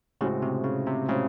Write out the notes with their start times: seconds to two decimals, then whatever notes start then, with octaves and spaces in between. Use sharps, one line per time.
0.21 A2 C#3 G#3 C4 F#4
0.42 C3
0.64 C#3
0.86 C3
1.08 A2 C#3 G#3 C4 F#4